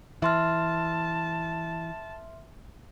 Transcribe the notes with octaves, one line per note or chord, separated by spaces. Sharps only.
E3 E5 A5 C6 F6